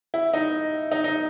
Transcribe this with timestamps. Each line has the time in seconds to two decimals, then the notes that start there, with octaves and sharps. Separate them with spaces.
0.14 E4
0.34 D#4
0.92 D#4
1.04 D#4